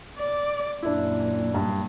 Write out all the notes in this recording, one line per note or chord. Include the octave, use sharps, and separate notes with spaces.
D5
F#2 A#2 D4 E4
G2